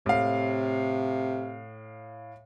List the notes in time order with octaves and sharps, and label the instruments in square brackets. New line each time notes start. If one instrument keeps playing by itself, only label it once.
[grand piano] A2 F5 [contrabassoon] C3